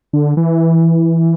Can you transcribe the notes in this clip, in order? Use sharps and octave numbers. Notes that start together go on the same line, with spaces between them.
D3
E3